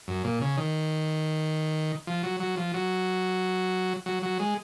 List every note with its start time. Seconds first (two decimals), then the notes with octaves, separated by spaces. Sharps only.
0.08 F#2
0.24 A#2
0.42 C#3
0.58 D#3
2.07 F3
2.23 F#3
2.40 F#3
2.57 F3
2.74 F#3
4.06 F#3
4.23 F#3
4.39 G#3